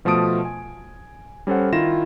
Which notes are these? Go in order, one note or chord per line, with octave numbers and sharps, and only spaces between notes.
B2 F3 A3 A5 D#6 D7
G#5
G3 C#4 A4 C5 F#5
D#3 E4 F4 A#6 E7